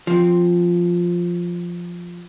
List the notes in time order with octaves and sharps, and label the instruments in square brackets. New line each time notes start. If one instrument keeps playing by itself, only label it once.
[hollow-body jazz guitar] F3 C4